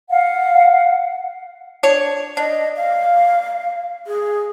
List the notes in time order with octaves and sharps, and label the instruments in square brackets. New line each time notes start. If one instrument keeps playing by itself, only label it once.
[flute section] F5 F#5
[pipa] D4 C#5
[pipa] D4 [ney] D#5
[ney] F5
G#4